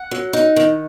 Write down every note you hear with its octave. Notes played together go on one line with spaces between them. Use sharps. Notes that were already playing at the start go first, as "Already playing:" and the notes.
Already playing: F#5
F#3
D#4
D#3